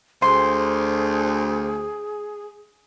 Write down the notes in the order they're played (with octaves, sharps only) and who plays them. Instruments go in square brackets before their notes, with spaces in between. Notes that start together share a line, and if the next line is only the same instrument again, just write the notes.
[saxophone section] D2 [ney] G#4 [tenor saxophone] C5 [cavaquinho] C6